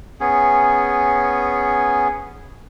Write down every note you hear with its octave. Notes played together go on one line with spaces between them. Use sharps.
B3 C#4 G#4